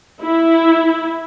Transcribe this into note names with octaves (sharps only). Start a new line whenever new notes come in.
E4